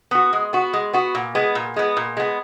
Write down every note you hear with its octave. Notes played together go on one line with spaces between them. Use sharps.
B3 F#4
G#3
B3 F#4
G#3
B3 F#4
A#2
G#3 B3
A#2
G#3 B3
A#2
G#3 B3